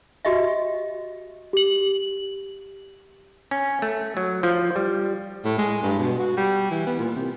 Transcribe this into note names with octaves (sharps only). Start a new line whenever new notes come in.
F#4 G4 D#5 E5
G4 F#7
C#4
A3
F#3
F3
G3
A2
G#3
G2
B2
F#4
G3
E3
B3
A#2
C3